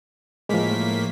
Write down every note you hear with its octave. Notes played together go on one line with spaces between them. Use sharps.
A2 F3 G#3 A#3 B6